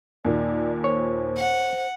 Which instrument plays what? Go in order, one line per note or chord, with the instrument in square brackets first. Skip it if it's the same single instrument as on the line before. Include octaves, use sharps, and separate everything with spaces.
[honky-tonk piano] D#2 A#2 [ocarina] D5
[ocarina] C5 [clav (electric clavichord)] C#5
[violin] F#5